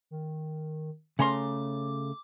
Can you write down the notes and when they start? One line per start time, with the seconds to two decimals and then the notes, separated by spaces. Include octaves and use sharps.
0.11 D#3
1.19 C#3 A3 C#4 A#5 C6 D6